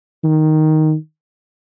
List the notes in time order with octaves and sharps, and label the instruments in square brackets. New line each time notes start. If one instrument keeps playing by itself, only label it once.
[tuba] D#3